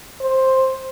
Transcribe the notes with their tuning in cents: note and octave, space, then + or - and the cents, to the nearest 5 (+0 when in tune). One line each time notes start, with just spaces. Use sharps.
C5 +10